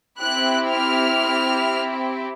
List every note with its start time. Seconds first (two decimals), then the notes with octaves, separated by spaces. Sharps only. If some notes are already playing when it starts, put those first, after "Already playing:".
0.20 C4 E4 G4 F#6
0.71 F6